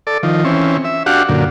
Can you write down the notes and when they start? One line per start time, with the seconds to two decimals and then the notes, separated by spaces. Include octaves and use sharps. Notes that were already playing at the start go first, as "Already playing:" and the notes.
0.07 A4 D5
0.23 D#3 F3
0.45 E3 C4 C#4
0.85 E5
1.06 D4 F#4 G4 F5 F#5
1.29 F#2 A#2 D3